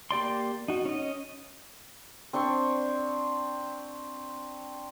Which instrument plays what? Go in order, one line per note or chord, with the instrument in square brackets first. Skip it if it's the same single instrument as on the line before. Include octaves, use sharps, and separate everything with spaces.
[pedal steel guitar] A#3 G4 D5 C6
D#4 F#4
C#4 D#5
[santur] C4 D4 C5 C#6